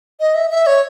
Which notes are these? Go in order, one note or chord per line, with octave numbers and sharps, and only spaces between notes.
D#5
E5
E5
C#5